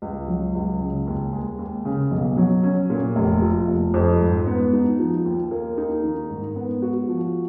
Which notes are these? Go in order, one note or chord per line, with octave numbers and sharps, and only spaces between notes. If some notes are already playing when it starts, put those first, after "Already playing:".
C#2
F#3
C#2
C#3
D#2
G#3
D#2
C#3
B1
F#3
C#4
A#2
F1
F3
F1
F2
G#2
B3
D#4
F3
D#2
A#3
D#4
D#3
G#2
B3
F#4
F3